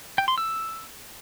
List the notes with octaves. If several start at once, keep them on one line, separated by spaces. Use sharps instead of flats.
G5
C6
E6